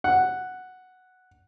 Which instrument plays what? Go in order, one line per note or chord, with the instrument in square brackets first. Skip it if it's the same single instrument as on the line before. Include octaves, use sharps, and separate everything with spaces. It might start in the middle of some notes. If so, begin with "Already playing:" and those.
[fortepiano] F#5